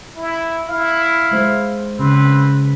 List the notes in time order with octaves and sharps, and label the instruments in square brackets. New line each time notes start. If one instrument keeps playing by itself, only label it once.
[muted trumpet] E4
[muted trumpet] E4 [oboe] F5
[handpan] G#3 C5
[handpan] C#3 [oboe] C4 [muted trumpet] B4